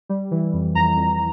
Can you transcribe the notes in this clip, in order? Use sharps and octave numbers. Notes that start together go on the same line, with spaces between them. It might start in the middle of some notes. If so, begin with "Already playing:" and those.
G3
E3
F2
F2 A#5
F2